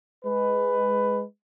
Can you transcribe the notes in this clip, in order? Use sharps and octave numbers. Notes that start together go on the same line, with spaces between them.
G#3 B4